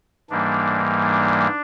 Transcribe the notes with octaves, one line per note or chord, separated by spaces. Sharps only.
G#2 E3 G3 A#3 D4
D4